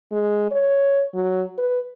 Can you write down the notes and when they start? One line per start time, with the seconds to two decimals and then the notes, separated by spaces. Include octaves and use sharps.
0.12 G#3
0.52 C#5
1.14 F#3
1.58 B4